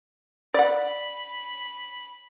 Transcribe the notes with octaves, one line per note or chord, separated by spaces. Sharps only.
D5 F#5 B5